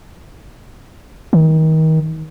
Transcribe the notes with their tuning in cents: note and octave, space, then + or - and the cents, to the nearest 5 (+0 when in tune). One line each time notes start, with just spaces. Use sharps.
D#3 +30